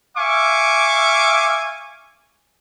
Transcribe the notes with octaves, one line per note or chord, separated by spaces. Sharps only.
E5 F5 G#5 C#6 D6